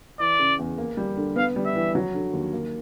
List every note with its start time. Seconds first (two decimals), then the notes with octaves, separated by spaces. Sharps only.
0.20 E3 D5
0.39 C#3
0.59 E2
0.78 A#3
0.97 G3
1.17 D3
1.36 B3 F5
1.56 G3
1.65 E5
1.76 E3
1.95 F#3
2.14 D3
2.33 D#2
2.53 A#3